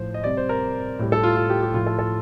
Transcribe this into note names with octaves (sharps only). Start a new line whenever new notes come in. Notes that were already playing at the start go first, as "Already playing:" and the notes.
Already playing: A2 F3 C5
D#5
C3 G3 D5
C5
A#4
A2 G3
A4
F4
F4
G4
G4
A2 F3 F4
A4
A4